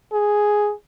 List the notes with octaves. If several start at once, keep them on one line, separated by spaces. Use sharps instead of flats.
G#4